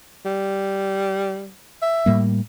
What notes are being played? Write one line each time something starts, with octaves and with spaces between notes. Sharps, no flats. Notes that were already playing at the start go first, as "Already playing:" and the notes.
G3
E5
A2 G3 A#3